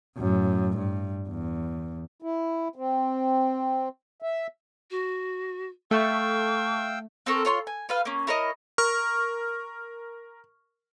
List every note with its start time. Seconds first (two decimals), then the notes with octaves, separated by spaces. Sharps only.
0.18 F#2 A2
0.76 G2
1.29 E2
2.22 E4
2.76 C4
4.22 E5
4.91 F#4
5.91 A3 F5 G5 C#6 E6
7.26 C4 A4 A#4 C#6
7.45 F4 C#5 A5 C6
7.67 G#5
7.89 F4 B4 F5
8.05 A#3 C#4
8.27 E4 A#4 C#5 D#5
8.78 A#4 C#6 F6